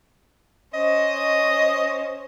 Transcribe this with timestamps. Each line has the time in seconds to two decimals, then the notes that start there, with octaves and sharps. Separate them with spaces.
0.74 C#4 C5 D#5